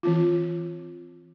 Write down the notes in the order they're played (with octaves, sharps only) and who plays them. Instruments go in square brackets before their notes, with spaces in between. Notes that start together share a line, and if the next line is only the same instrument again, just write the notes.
[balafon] E3 C4 F4